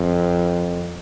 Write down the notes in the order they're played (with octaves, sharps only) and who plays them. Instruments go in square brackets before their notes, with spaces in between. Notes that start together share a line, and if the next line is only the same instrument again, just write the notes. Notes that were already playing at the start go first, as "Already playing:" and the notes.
Already playing: [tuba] F2